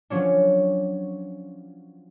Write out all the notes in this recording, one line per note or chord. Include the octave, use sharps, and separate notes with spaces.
F3 F#3 C#4 D4